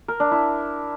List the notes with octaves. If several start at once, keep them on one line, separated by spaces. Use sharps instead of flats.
A#4
D4
E4